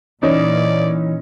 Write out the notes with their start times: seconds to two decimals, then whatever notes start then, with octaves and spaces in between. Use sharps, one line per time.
0.23 A#2 E3 C#4 D#4 D5